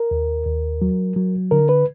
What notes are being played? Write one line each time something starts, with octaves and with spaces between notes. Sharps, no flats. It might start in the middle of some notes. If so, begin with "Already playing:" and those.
Already playing: A#4
D#2
D#2
F#3
F#3
D3 A#4
B4